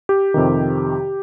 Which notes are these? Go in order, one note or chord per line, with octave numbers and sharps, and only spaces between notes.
G4
F2 C3 D#3